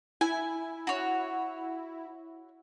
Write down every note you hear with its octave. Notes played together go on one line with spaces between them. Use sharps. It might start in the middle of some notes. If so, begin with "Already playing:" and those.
E4 G#5
F#4 C#5